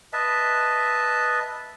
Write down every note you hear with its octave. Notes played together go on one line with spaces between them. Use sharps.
B4 D#5 E5 A5